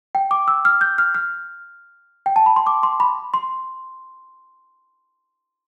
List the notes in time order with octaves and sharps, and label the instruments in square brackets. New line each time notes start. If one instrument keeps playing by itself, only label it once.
[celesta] G5
D6
E6
F6
G6
F6
F6
G5
A5
B5
C6
D6
C6
B5
C6